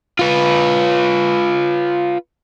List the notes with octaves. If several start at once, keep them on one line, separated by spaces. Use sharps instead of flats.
F4 B4